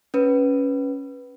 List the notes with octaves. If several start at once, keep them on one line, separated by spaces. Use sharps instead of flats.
C#4 B4